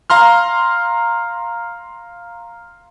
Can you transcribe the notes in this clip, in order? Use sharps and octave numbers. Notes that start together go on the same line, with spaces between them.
F5 A#5 C6 F6